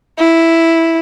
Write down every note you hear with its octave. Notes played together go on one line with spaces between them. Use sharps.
E4